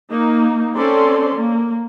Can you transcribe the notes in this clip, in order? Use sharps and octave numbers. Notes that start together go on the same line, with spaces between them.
A#3 D#4
C4 C#4 A4 D5 C6
A#3